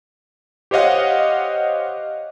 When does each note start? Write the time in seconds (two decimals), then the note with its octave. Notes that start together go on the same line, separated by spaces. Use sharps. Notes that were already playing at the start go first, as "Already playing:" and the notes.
0.71 G4 C5 C#5 D#5 F5 F#5